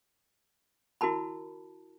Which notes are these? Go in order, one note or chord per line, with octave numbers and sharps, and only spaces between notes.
E4 F#4 A#4 A5 B5